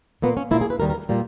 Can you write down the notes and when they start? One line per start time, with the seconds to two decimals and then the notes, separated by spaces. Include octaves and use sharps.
0.22 A#2 A#3 B3
0.37 C#4
0.51 A#2 A#3 E4
0.61 G#4
0.70 B4
0.80 D#2 D#3 G3 A#4
0.90 A#4
1.09 A#2 G3 A#3